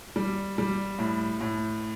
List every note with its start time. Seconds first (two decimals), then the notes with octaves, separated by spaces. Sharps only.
0.16 G3
0.58 G3
0.99 A2
1.41 A2